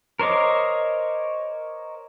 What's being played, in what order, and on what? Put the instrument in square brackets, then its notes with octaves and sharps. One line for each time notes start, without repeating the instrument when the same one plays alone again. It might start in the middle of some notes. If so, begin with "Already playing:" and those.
[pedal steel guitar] A#4 C5 C#5 D#5 D6